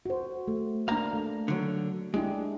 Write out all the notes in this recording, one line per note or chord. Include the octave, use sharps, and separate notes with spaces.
F#4 C5
A3
A#3 D4 F5 A#5
A3
D3 F#3
G#3 D4 E4 G4